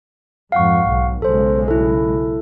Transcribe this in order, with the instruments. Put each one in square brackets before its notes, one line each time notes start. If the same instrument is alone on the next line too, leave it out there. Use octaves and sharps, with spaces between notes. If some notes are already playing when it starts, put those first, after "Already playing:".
[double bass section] F2 G#2 [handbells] F5 F#5 C#6
[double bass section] B1
[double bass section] B1 C#3 G#3 [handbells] A4 C5
[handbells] E4 A4